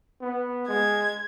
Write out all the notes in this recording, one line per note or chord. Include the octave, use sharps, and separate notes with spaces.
B3
G#3 G#6